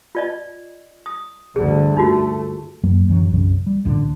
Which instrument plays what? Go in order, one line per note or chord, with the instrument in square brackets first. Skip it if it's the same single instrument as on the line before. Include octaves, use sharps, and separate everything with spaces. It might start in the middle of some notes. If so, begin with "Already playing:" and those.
[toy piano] F4 D5 D#5
D#6
[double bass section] D2 G2 D3 [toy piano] G#4
[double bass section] A3 [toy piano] D#4 F4 F#4
[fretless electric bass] F#2 F#3 A#3
D1 F#2 E3 F#3
B1 F#2 C3
G3
A1 D2 A#2 D3